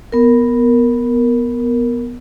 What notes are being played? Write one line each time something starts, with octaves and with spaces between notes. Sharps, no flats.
B3 A#4